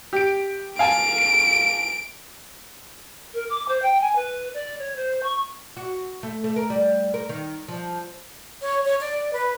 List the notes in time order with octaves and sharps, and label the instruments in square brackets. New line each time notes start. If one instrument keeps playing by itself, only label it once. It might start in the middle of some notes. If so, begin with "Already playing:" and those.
[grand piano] G4 D7
[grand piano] F5 G#5 A5 [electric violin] D7
[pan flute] A#4
D6
C5
G5
G#5
B4
D5
C#5
C5
C#6
[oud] F#4
A3
A3
A#4
G3
A#4
D#3
F3
[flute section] C#5
C#5
D5
B4